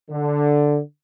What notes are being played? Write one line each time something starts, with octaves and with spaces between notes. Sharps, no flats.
D3